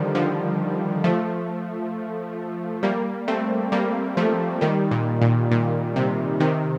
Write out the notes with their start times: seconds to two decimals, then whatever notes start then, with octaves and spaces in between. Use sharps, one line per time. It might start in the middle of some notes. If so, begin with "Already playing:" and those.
Already playing: D3 D#3 F3 G3
0.15 D3 F3
1.04 F3 A3
2.83 G3 A#3
3.28 A3 C4
3.72 G3 A#3
4.17 F3 A3
4.61 D#3 G3
4.91 A#2
5.22 A#2
5.51 A#2
5.96 C3
6.40 C3 D#3